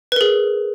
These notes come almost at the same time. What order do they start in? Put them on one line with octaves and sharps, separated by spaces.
B4 A#4 G#4